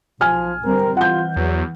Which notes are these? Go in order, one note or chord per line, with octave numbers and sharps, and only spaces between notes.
B1 F3 G#5 F6
D3 G3 C4 A#4
E3 F4 F#5 G6
E2 F#3